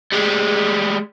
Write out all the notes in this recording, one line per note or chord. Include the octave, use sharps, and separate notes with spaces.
G3 G#3